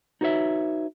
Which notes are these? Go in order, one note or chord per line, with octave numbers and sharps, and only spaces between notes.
D#4 F#4 B4 C#5 E5